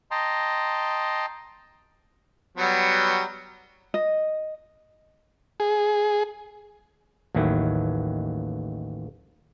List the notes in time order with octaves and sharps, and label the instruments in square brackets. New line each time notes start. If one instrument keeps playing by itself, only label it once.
[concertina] D#5 G5 A5 A#5 C6
[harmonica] F#3 G3 B3
[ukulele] D#5
[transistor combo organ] G#4
[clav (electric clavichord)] A1 D#2 D#3 F#3 E4